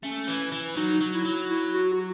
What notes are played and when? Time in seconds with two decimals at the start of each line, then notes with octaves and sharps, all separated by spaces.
0.03 A3 C#4
0.28 E3
0.52 E3
0.77 F#3 D#4
1.01 F#3
1.14 E4
1.26 F#3
1.50 E4
1.74 F#4
1.93 F#4